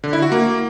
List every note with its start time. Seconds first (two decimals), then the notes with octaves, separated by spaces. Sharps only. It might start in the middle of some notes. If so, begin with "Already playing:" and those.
0.04 D3
0.13 E4
0.22 F#4
0.32 A#3